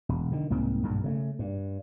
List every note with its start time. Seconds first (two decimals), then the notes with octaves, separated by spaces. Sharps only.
0.09 E1
0.32 D3 D#3
0.50 C2 G#2 A#3 C4
0.83 B1 G2 A#2
1.04 C#3 G#3 A3
1.39 G2